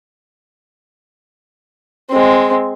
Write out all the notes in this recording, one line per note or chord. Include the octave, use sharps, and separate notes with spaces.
G#3 C4